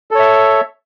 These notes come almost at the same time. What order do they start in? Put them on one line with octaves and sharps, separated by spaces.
A4 C#5 E5